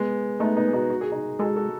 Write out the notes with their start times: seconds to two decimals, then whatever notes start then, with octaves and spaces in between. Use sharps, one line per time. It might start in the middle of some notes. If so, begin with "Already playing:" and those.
Already playing: G#3 B3
0.40 A3 B3 D#4
0.57 B3 D#4
0.68 G#4
0.73 D#4 F#4
0.90 F#4
1.01 G#4
1.12 D#4 F#4
1.39 G#3 F#4 A4
1.56 F#4 A4